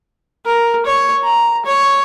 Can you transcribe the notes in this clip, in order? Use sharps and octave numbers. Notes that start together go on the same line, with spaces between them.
A#4
C#5
A#5
C#5